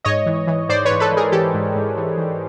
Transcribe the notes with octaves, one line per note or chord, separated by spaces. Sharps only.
G#2 C#5 D#5
E3
E3
G#2 C5 D5
B4 C#5
G#2
A4 B4
E3 G#4 A#4
E3 G4 A4
G#2
G#2
E3
E3